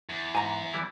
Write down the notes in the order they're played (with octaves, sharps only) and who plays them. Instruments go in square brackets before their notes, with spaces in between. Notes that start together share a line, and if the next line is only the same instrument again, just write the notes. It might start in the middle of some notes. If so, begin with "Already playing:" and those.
[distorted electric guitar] E2
[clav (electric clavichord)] G#2 [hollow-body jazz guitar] G#5 A#5
[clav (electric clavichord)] E3 G3 E4